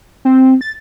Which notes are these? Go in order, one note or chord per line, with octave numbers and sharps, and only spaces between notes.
C4
A6